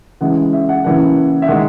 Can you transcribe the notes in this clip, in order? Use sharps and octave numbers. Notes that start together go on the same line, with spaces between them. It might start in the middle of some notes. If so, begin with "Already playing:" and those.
C#3 E3 G#3 F#5
E5
F#5
C#3 E3 A#3 F#5
E5
D#3 G#3 F#5